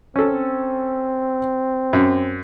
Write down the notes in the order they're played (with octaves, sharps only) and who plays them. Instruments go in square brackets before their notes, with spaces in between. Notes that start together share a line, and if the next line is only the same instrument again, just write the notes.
[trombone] C4 [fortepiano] C#4 A4
[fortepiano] F#2